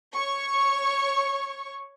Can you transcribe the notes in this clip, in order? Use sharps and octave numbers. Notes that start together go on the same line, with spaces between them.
C#5 C#6